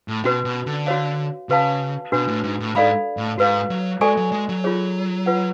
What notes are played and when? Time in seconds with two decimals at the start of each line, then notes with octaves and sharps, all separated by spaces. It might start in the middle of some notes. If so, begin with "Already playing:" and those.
0.08 A2
0.24 B2 C#4 F#4 B4
0.45 B2
0.66 D3
0.87 F#4 C#5 F5
1.49 C#3 F#4 B4 F5 A5
2.12 B2 D4 F#4 B4
2.28 A2
2.44 G#2
2.60 A2
2.75 G#2 A4 D5 F5 B5
3.17 A2
3.38 G#2 F#4 B4 F5
3.70 F#3
4.01 G#3 F#4 A4 D5 G#5 C#6
4.17 F#3
4.32 G#3
4.49 F#3
4.64 F4 G#4 C#5
5.26 F4 B4 F#5